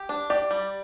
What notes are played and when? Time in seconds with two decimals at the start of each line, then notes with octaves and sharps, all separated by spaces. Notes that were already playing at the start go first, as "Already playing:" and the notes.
Already playing: G4
0.09 D4
0.30 G4 D5
0.51 G3